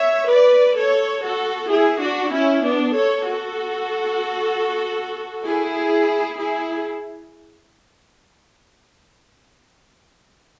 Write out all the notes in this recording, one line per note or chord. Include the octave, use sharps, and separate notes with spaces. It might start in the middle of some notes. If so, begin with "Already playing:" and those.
Already playing: C#5 E5
B4 D5
A4 C#5
F#4 A4
E4 G#4
D4 F#4
C#4 E4
B3 D4
A4 C#5
F#4 A4
E4 G#4
E4 G#4